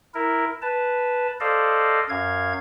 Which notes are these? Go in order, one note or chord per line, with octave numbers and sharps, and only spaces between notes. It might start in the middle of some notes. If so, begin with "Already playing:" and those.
E4 A#4
B4 A5
A4 C5 D5 D#5 F5
F#2 F5 G#6